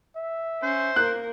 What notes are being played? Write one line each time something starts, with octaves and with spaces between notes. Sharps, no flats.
E5
C#4 C5
A#3 A#4 F#6